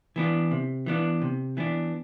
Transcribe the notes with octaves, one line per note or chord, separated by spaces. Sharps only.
E3 B3 D4
C3
E3 B3 D4
C3
E3 B3 D4